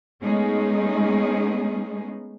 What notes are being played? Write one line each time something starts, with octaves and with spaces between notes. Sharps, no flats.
G#3 A3 B3 C#4 D#4 G#4